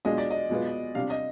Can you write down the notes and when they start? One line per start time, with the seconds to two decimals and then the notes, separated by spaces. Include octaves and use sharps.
0.05 B2 G#3 D4 F4 D#5
0.18 D5
0.31 D#5
0.50 B2 G#3 B3 F4
0.95 C3 G3 D4 F5
1.10 D#5